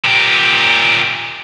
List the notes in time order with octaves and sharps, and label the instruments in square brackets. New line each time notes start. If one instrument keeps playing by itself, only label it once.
[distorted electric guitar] A#2 G4